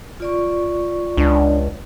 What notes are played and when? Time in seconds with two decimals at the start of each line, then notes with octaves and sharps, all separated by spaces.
0.20 F4 D5 C#6
1.17 C#2 D4